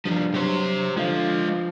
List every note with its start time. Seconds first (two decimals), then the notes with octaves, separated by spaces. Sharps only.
0.05 G2 F3 G3
0.34 F#3 G4 C5
0.97 D3 F3 G#3 F5